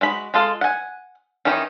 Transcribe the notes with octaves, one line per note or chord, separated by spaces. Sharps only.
G#3 F#4 B5
G#3 F4 A4 F5
F#5 G#5
D#3 E3 C#4 D#4